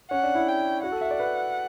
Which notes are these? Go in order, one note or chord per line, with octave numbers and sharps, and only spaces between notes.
C#4 F#5
D4
E4
G5
F#4 F#5
A4
E5
D5
B4